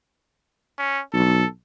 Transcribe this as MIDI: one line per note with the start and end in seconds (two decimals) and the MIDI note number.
0.78 1.01 61
1.13 1.43 35
1.13 1.46 69